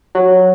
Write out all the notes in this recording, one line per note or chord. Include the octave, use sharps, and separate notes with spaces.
F#3